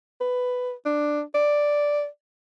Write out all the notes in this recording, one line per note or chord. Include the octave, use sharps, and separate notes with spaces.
B4
D4
D5